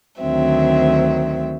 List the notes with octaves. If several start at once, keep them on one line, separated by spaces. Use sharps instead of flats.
D2 D3 D#3 F#3 C4 E5